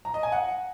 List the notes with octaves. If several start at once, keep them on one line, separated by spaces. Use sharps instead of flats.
A#5
D#5
G#5
F#5